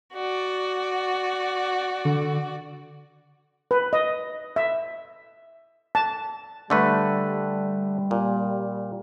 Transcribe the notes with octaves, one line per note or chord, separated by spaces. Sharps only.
F#4 D5
D3
B4
D#5
E5
A5
D3 G3 A3 B4
A#2